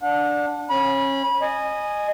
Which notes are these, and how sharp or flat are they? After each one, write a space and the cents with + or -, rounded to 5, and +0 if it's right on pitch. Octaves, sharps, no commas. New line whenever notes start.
D4 +0 F#5 -35
C#4 -25 B5 -25
D#5 -20 G#5 +0